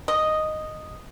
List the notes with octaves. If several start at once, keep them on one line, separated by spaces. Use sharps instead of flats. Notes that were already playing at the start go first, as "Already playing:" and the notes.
D#5